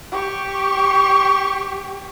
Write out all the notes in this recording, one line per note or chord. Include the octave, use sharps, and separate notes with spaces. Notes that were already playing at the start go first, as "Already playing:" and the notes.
G4 C#6